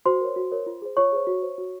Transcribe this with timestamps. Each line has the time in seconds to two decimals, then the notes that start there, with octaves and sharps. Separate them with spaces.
0.06 F#4 C5 C6
0.21 A#4 C#5
0.36 F#4
0.52 A#4 C#5
0.66 F4
0.82 G#4 C5
0.97 F4 C#5 C#6
1.12 G#4 C5
1.27 F#4
1.42 C5
1.58 F#4